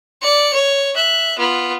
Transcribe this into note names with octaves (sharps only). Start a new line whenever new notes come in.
D5 C#7
C#5
E5 F#6
B3 F4